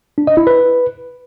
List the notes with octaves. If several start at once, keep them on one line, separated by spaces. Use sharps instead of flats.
D4
D#5
E4
B4